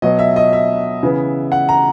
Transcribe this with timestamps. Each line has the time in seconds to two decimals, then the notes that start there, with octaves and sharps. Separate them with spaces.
0.02 B2 F#3 B3 D#5
0.19 E5
0.36 D#5
0.53 E5
1.03 C#3 E3 B3
1.52 F#5
1.69 A#5